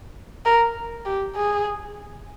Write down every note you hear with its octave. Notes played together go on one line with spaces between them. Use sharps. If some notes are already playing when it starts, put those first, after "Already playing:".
A#4
G4
G#4